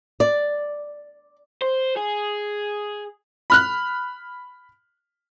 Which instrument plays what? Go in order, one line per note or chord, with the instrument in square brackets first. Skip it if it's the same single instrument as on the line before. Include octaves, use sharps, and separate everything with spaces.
[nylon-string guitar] D5
[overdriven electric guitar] C5
G#4
[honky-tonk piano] B5 F6 F#6